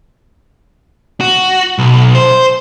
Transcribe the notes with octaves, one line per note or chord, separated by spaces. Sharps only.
F#4
B1
C5